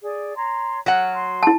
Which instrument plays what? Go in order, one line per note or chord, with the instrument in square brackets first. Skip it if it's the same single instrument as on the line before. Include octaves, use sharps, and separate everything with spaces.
[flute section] G#4 D5
C#5 A#5 C6
[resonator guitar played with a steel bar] F#3 F#4 F#5 [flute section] F6
[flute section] C6
[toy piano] E4 A5